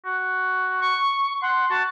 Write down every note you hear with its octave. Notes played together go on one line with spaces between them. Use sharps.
F#4
C#6
F#5 C6
F#4 A5